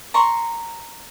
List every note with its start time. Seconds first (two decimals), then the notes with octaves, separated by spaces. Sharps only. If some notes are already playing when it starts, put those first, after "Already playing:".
0.14 A#5 C6 C#6